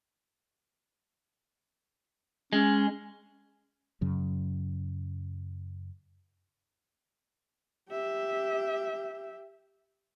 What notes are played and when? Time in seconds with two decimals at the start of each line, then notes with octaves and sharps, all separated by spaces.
2.53 G#3 C#4
4.01 F#2 C#3 F#3
7.89 G4 E5